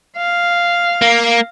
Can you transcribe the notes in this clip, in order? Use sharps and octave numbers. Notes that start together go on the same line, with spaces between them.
F5
A#3